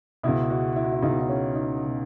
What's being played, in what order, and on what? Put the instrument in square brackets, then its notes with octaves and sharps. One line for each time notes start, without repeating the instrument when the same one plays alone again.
[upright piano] C#2 B2 E4
F#4
E4
F#4
E4
C#2 B2 D#4
D#4
C#4
D#4
B2